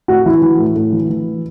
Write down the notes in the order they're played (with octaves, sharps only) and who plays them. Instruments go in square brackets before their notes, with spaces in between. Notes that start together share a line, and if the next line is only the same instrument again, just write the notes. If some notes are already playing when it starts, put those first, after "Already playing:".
[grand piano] A2 F#4
E3 E4
E3
A2
A2
E3
E3